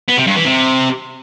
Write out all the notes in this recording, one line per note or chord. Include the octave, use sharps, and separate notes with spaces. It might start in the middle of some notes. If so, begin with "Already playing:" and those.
B3
C3
G2
E3
C3